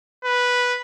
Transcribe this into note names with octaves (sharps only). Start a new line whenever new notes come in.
B4